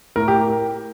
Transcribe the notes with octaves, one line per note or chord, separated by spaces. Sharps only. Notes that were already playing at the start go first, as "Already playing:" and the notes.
A2 A#4
G4